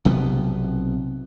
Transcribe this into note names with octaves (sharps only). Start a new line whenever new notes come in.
B1 C3 F3 B3